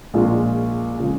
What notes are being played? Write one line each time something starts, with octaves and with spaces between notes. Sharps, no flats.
A#1 A#2 G#3 F4
C#3 F3 G#3